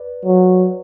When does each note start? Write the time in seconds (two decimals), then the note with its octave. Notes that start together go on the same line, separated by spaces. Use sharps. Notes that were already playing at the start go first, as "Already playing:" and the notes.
Already playing: B4 D5
0.25 F#3